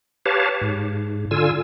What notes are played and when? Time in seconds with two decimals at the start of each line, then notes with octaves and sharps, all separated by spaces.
0.26 G4 B4 C#5 F5 A5
0.61 G#2
1.31 D3 F4 G#5 E6